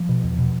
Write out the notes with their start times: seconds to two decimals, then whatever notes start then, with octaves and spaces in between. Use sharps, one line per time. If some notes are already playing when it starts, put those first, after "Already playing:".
Already playing: F3
0.09 B2
0.23 E2
0.38 B2